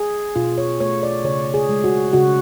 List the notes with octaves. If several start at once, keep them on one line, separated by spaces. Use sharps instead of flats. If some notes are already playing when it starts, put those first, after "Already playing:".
Already playing: G#4
B2 F4
C#5
A3 C#5
D5
C#3 C#5
G#4
G#3
F#4
C#3 F#4